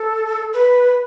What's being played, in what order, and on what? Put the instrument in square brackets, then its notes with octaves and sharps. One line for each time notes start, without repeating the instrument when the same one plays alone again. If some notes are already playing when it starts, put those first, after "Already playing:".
Already playing: [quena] A4
B4